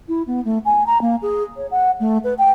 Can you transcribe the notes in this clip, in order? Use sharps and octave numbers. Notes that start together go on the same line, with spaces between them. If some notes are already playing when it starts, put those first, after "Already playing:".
E4
B3
A3
G#5
A#5
A#3
G#4
C#5
F#5
A3
B4
G5